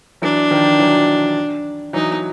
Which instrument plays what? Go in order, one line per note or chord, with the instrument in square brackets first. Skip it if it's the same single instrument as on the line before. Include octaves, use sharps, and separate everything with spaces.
[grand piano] E3 F#3 [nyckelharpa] D4
[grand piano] D#3 F3
E3 F#3
[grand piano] E3 F#3 [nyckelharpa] D#4